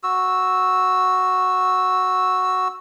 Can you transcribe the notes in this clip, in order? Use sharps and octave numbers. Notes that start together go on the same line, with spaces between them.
F#4 E6